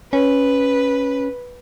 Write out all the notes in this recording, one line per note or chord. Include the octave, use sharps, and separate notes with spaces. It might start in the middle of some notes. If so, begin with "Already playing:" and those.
C#4 B4